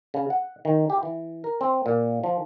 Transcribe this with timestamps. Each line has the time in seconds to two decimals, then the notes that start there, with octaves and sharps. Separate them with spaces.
0.14 C#3
0.30 F#5
0.65 D#3
0.90 G4
1.03 E3
1.44 A#4
1.61 C4
1.86 A#2
2.24 F3